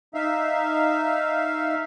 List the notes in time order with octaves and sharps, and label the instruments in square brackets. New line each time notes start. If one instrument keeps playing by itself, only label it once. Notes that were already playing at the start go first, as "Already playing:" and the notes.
[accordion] D#4 E5 F5